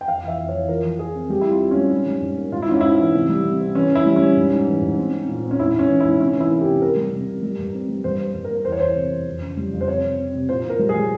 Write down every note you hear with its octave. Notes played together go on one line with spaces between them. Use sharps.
G5
F2 F5
E3 E5
F2
E3 C#5
F3 A#4
F3
F3 G#4
C4
G3 G4
C4 E4
F4
C4
G3 C#4
G#2
G3
G#2
A#3
G#2 F4
E4
G#2 C#4
G#2 E4
E3
C3
G3
C3
C4
E3 C#4
E3 E4
G3
C#4
G3
G#2
G#2
E3
G#2
C4
C4
A#2
C4
C#4
G#2 E4
G#2
C#4
E3
G#2 E4
C3 C#4
E3 E4
A#3
G4
C3
C3 A#4
G3
C3
C3
G3
G2
C4
G3
G2 C5
G2 C5
G2
A#4
A#3
E2 C5
C#5
E2 C5
C3
E2
F2
C#3
G3
F2
C5
C4 C#5
C3
C4
C3
A#2 C5
A#2
A#4
G3
G#4
G3